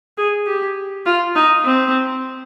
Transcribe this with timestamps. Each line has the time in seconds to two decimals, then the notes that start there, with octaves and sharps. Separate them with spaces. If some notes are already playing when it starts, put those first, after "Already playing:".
0.18 G#4
0.46 G4
1.06 F4
1.35 D#4
1.65 C4